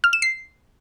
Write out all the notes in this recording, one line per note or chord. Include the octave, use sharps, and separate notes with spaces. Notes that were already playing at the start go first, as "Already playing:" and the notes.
F6
E7
C7